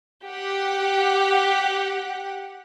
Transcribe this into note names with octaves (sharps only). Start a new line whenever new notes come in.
G4 F#5